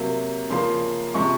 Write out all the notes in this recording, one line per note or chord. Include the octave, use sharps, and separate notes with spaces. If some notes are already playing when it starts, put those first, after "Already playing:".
Already playing: C3 F#3 A#3
C#3 F3 A#3 C6
C3 F3 G#3 C#6